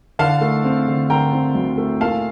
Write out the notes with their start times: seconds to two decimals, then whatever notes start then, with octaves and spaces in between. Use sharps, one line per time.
0.19 D3 F5 A5
0.41 A3
0.64 C4
0.87 D3
1.10 D3 G5 A#5
1.33 C4
1.55 D2
1.78 A3
2.00 A#2 F5 A5